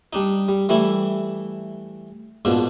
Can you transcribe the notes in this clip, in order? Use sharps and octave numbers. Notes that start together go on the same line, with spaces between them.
G3 D4 D#4
G3
E3 G3 A3 E4
A#1 G#2 B2 F3 D4